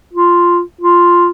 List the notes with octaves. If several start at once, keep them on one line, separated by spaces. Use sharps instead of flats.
F4
F4